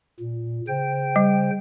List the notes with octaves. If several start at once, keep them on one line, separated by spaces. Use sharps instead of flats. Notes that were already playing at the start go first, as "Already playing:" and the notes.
A#2
C#3 C5 G5
G3